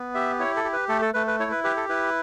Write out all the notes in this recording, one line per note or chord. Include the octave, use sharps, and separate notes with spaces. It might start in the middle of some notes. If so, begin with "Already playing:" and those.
Already playing: B3
G4 E5
E4 C#5
A4
G4
B4
A3 A4
A4
A3 B4
B4
E4 C#5
B4
G4 B4
A4
E4 B4